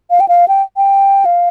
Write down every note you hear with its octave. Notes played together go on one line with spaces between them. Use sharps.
F5
G5
F5
G5
G5
F5